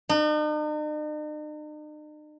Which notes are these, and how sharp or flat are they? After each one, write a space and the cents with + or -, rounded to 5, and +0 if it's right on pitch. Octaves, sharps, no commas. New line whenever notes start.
D#4 -45